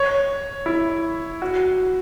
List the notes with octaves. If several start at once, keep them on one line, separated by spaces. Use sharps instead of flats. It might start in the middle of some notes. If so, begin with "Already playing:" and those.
Already playing: C#5
E4
F#4